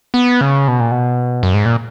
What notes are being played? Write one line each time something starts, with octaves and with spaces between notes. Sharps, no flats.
B3
C#3
B2
A#2
B2
F#2
G#2
A#2